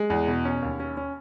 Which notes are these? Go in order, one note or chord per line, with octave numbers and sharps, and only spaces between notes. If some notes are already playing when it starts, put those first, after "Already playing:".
Already playing: G#3
E2
B2
C#4
D#2
C#4
C#4